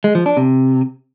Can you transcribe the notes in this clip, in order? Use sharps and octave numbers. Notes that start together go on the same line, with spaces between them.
G#3
F3
D4
C3